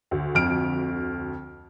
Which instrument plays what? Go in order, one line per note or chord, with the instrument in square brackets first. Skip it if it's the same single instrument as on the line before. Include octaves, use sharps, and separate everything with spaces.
[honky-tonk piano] D2
[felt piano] F2 F6 D7